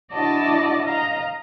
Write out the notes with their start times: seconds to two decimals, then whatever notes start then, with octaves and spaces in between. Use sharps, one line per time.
0.13 D4 E4 F#4 D5 D#5 A5
0.85 D#5 F5 A#5